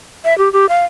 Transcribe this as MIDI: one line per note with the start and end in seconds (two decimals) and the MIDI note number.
0.25 0.37 76
0.38 0.52 67
0.53 0.68 67
0.69 0.85 77